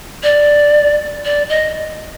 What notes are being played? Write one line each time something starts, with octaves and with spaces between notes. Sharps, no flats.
D5
D5
D#5